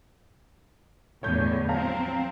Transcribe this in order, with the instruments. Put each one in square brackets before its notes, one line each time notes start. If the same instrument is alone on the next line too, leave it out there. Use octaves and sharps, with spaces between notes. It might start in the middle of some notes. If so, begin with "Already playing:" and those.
[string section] E2 A2 D3 [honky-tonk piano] C#5 G6
[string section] F#3 C4 [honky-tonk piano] F5 A#5